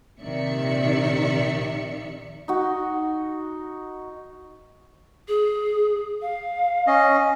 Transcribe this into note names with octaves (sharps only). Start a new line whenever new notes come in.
A#1 C3 D#3 D5 E5 C#7
D#4 F#4
G#4
F5
C#4 D#5